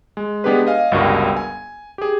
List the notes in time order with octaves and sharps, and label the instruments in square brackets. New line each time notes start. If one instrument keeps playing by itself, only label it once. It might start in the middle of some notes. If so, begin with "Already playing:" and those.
[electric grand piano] G#3
G#3 B3 D4 G4 G#4 B4
D#5 F5 G#5
G1 C#2 G2 F#4 A#4
G#5
G4 G#4